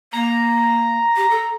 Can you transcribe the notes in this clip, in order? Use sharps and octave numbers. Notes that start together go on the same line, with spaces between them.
A#3 A#5
G4
A4